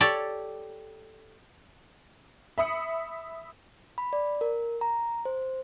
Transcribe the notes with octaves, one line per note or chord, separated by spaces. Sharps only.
G4 A4 C#5 D5
E5 B5 D#6 C#7
B5
D5
A#4
A#5
C5